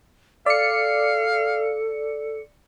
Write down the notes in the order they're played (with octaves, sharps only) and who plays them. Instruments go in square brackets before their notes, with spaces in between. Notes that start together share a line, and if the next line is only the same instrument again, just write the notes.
[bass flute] A4 [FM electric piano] D5 C#7 [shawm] F5